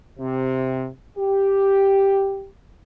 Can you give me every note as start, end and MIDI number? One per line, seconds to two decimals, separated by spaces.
0.19 0.87 48
1.17 2.48 67